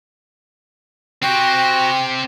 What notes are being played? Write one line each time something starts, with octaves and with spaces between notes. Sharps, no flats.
C4 F#4 G4 G5 F#6 A#6